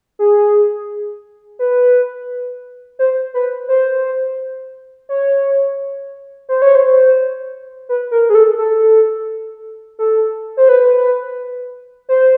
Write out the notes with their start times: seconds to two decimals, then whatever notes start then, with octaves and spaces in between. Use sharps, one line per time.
0.19 G#4
1.59 B4
2.99 C5
3.34 B4
3.69 C5
5.09 C#5
6.49 C5
6.62 C#5
6.75 C5
7.89 B4
8.11 A#4
8.30 G#4
8.35 A4
8.58 A4
9.99 A4
10.57 C5
10.69 B4
12.09 C5